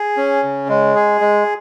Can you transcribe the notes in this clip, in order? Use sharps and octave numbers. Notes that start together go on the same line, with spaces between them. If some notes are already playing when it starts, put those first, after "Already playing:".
Already playing: G#4
C#4
C#3
G#3
G#4
G#3